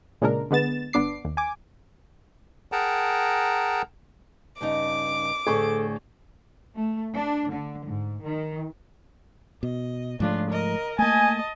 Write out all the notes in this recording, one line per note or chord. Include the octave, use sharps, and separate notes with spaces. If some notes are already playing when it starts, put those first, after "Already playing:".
A#2 C#3 G#3 D4 A#4
D3 G#3 B3 A6 E7
G1 B3 D4 D6 C7
D#2
G#5 D6
G#4 A#4 F#5 G5 A5 A#5
G2 C#3 D#4 D6
D2 A2 D3 G#4 A4 C#6
A3
D4
D3
G#2
D#3
B2 D#5
G#2 C#3 F3 A3 D4 F4
A#4 D#5
A3 A#3 D#5 G#5 A5